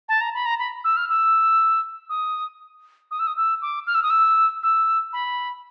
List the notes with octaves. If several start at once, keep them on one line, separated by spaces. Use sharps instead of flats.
A5
A#5
B5
A#5
B5
E6
F6
E6
D#6
D#6
E6
D#6
E6
D6
F6
E6
D#6
E6
E6
B5